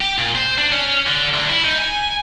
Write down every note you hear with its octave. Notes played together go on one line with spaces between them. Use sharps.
G4
A#2
C5
D4
C#4
D3
D2
E4
D#4
G#5